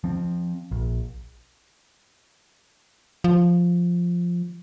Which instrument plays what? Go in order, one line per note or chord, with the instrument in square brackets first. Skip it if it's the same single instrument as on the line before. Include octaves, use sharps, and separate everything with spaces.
[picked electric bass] F3 C4
A#1
[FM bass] F3